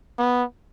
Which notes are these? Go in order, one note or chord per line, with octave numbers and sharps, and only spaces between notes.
B3